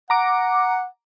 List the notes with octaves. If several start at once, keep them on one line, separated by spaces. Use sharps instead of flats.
F#5 A#5 D6